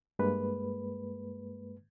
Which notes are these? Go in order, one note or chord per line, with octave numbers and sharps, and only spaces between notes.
G2 G#3 A#3 B4